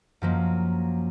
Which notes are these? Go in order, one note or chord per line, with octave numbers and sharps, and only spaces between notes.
F#2 F3 A#3